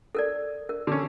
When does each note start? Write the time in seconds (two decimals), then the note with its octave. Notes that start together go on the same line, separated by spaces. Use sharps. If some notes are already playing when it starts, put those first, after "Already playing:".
0.15 A4 A#4 D5
0.69 A#4
0.87 D3 C#4